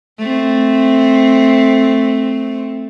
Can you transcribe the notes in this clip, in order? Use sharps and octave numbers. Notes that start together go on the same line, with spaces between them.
A3 C4